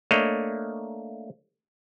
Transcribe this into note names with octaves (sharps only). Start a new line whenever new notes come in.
A3 A#3 D4 C#5 D#5